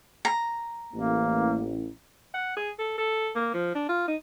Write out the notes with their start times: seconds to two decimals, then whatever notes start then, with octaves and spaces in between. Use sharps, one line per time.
0.25 A#5
0.93 A1 A#3
2.34 F#5
2.56 G#4
2.79 A4
2.98 A4
3.35 A#3
3.54 F3
3.75 D4
3.89 F4
4.08 D#4